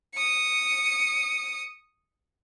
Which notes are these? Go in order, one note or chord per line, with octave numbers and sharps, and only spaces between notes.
D#6 C#7